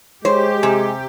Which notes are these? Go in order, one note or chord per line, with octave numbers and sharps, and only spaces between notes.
G#3 G4 C5 C#5
C3 G#5